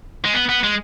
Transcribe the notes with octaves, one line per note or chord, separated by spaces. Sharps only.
G#3
B3
B3
G#3